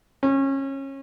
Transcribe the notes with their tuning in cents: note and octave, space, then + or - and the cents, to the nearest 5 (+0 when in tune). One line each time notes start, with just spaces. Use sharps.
C#4 -25